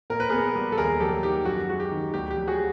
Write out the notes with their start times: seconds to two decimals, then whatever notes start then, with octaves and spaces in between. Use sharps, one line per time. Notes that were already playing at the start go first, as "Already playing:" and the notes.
0.10 A#2 A#4
0.20 B4
0.30 B3 G#4 A#4
0.55 G3
0.72 A4
0.78 D#2 G#4 A#4
1.00 F#3 G4 A4
1.23 D#3 G4
1.45 F#2 F#4
1.69 G#3 F#4
1.80 G4
1.91 D#3
2.14 D2 G4
2.31 G4
2.37 F#3
2.48 F#4 G#4